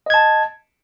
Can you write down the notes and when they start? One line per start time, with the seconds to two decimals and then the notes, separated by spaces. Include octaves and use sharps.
0.06 D#5
0.10 G#6
0.14 A5